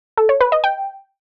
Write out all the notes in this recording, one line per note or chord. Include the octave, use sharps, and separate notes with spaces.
A4
C#5
B4
D#5
G5